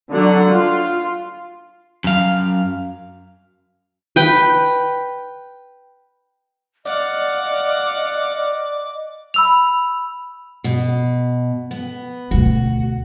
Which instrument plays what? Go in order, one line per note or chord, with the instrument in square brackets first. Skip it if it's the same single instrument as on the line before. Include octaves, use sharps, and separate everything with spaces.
[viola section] D3 F#3 F#5
F4
[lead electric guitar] F#2 F5
[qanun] B4 G5
[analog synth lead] D5 [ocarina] D#5 [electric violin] F5 F#5 [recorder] D6
[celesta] B5 E6 F7
[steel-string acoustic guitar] B2
B3
[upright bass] D2 B2 [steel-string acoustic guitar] F#4